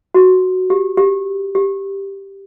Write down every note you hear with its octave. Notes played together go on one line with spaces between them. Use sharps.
F#4
G4
G4
G4